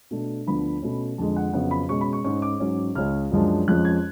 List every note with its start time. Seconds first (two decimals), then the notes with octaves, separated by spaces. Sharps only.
0.11 B2 A3 D4
0.47 D2 D3 F3 B3 D4 B5
0.82 B2 A3 C#4
1.18 F2 D3 G#3 A5
1.36 F#5
1.53 F2 C#3 F#3 B3 F#5
1.71 B5
1.89 B2 G#3 C#4 C#6
2.01 B5
2.13 C#6
2.24 G#2 G#3 C#4 C#6
2.42 D6
2.60 G#2 F#3 C#4
2.95 C#2 C#3 G#3 C#4 F6
3.32 F#2 F3 G#3 D4
3.68 F2 F3 G#3 C#4 F#6
3.85 G#6